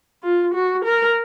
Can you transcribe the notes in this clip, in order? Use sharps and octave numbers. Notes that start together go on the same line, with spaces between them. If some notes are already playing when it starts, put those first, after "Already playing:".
F4
F#4
A#4